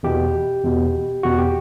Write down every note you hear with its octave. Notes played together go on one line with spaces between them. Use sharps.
E2 B2 G4
E2 B2
E2 B2 F#4
G4